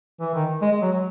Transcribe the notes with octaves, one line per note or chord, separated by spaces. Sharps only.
E3
D#3
G#3
G#3
F#3
F#3